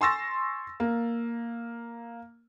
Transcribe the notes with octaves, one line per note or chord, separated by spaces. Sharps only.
G#5 C6 C#6 E6 A6 A#6
A#3